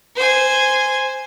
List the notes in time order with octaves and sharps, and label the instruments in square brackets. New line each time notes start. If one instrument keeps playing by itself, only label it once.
[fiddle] C5 G#5